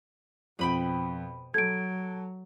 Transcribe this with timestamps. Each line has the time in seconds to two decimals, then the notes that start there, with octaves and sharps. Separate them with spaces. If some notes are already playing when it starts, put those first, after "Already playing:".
0.59 F2 B2 G5 B5 D#6
1.54 F#3 A4 G#6 D7